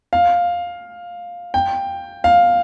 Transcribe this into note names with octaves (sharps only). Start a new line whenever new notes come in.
F5
G5
F5